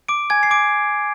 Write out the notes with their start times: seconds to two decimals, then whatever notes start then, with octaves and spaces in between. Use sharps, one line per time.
0.09 D6 D7
0.30 G#5 G#6
0.43 C7
0.51 D6 D7